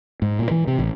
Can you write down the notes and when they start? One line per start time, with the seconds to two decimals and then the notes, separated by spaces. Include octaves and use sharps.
0.22 G#2
0.39 A#2
0.51 E3
0.67 C3
0.79 A1